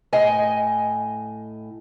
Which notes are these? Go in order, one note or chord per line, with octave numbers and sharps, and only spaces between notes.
A2 D#5 G#5